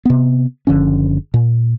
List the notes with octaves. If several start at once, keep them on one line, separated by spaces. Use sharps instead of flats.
C3 B3
F#1 D3 F3 C#4
A#2